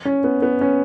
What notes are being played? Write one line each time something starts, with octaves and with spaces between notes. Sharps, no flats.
C#4
B3
B3
C#4